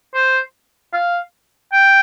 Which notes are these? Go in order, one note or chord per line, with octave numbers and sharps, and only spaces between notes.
C5
F5
G5